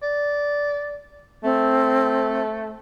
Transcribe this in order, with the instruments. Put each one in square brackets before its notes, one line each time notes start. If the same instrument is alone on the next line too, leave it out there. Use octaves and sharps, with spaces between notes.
[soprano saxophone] D5
[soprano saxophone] A3 [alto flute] C4